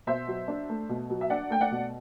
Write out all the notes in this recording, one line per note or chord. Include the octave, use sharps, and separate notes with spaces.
B2 C5 E5
F#3
D4
A3
B2
F#3
E5
D4 D5 F#5
A3 G5
D5 F#5
B2